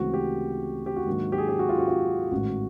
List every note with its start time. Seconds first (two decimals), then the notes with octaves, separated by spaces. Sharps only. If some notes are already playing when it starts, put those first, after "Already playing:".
Already playing: D2 C#3 E3 G#3 C4 F#4
0.14 G4
0.86 G4
0.96 F#4
1.06 G#2 D#3 F#3 A#3 D4
1.32 G4
1.38 G#4
1.49 G4
1.59 F#4
1.69 F4
1.78 F#4
1.88 F4
2.31 A1 G#2 D#3 F#4